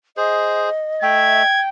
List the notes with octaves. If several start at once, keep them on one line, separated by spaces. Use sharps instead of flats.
G#4 C5 D#5
A3 E5 G5 G#6